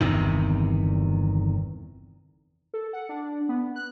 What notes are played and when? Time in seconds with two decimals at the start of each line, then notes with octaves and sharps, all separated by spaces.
0.01 G1 E2 C3 D#3
2.74 A4
2.93 F#5
3.09 D4
3.49 B3
3.76 F#6